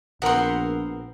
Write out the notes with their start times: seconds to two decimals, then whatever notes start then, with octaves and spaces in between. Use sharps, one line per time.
0.22 A#1 B3 C4 A#4 F#5 C6